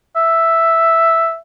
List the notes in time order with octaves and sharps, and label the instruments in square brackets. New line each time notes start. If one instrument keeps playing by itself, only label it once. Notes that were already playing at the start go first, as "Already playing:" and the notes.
[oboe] E5